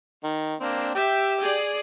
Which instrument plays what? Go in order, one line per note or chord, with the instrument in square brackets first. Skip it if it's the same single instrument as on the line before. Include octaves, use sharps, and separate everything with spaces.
[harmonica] D#3
A#3 C4 D4
[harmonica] G4 G5 [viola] E5
[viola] G#4 D5